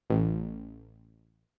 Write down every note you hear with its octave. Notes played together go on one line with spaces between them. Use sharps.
A1